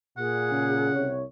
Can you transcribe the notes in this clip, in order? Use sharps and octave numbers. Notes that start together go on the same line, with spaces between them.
A#2 G#4 F#5
C#3
C2 C#5